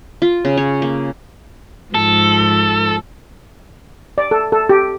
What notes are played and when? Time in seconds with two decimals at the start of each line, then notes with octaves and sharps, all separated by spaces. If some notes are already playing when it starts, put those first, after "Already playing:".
0.22 F4
0.45 C#3
0.57 C#5
0.82 A#3
1.95 G#2 F3 A4
4.18 D5
4.31 A4
4.52 A4
4.69 G4